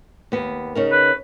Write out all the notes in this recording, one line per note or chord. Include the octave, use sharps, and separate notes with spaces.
D#2 B3
C#3 D#4 A#4
B4